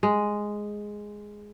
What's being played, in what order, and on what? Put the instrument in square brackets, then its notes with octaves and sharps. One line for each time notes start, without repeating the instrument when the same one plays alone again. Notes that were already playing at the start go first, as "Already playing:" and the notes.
[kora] G#3